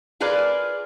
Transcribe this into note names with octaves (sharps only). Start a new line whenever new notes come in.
F4 G#4 A#4 B4 D5